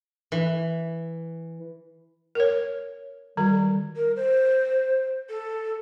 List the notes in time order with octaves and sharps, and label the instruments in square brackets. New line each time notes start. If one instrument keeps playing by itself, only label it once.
[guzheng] E3
[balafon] A#4 C#5
[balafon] D#3 A4 [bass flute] G3
[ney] A#4
C5
A4